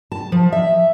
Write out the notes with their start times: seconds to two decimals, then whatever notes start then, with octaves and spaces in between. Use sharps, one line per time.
0.12 A5
0.32 F3
0.53 E5